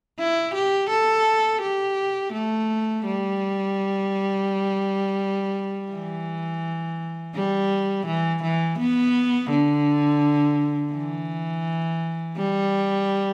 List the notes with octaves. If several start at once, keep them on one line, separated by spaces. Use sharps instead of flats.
E4
G4
A4
G4
A3
G3
E3
G3
E3
E3
B3
D3
E3
G3